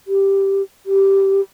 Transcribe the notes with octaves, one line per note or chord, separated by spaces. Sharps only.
G4
G4